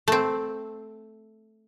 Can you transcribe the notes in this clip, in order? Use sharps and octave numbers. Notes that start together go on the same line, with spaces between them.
A3 C4